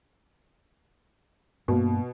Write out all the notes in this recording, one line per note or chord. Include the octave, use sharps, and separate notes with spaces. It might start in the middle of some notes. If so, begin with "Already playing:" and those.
G2 B2 A#3